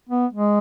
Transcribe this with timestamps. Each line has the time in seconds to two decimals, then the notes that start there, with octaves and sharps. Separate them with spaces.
0.09 B3
0.33 G#3